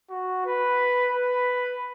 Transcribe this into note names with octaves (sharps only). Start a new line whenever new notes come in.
F#4
B4
B4